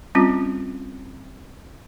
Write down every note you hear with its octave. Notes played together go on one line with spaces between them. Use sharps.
G3 C4 C#4 F4